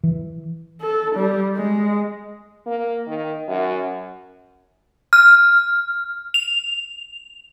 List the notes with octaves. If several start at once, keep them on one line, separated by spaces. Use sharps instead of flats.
E3
A4
G3
G#3
A#3
D#3
F#2
F6
F7